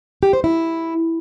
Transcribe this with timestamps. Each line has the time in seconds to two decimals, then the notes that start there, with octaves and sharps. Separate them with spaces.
0.23 G4
0.33 C5
0.44 E4